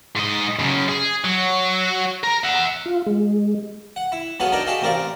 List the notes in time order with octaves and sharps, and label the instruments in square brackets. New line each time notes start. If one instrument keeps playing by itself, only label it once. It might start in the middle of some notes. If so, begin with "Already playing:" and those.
[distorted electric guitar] G#2 D#5
F#2 C#3
G#4
F#3
A#4
E5 F#5
[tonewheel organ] F4
G#3
[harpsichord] F#5
E4
F#3 B3 G#4 A4 B4 F5
D4 D#4 A4 A#4 D5 D#5
F#4 G#4 A4 E5 F5 G5
A1 C4 A#4 D5 F5